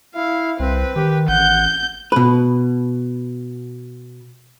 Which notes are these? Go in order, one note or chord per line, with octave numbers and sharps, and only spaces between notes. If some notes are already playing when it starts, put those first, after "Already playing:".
E4 F5
C2 C4 B4
D#3 G4
A1 F#5 G6
B2 B4